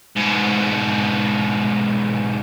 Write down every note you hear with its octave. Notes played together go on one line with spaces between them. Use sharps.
G#2 B2